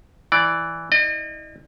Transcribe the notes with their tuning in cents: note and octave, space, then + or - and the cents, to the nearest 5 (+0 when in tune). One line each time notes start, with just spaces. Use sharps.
E3 +0 D5 +0
E4 -40 D#5 -45